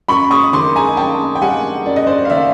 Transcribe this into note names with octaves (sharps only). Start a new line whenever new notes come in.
F#2 B5 C#6
C#6 D#6
D#3 C6 D6
G#5 A#5
F#2 G5 A5
G5
G3 F#5 G#5
F#2 D5
D#5
C5 D5
F5
D#3 D5 E5